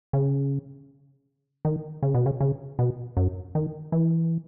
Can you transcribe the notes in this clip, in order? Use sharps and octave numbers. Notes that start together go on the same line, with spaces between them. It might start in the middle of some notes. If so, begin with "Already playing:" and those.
C#3
D#3
C#3
B2
C#3
C#3
B2
F#2
D#3
E3